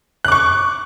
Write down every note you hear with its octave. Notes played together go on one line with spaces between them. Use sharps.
C#6 D6 F#6